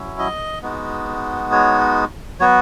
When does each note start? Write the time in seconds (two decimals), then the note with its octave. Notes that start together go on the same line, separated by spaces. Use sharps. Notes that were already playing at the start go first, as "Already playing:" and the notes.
Already playing: F#3 C#4 E4
0.19 D#5
0.63 G#3 B3 D#4 F#4
1.52 C#5
2.40 F#3 B3 F#4 C#5